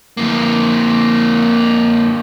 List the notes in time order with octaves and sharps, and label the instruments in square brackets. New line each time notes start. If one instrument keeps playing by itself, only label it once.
[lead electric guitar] F2 A#3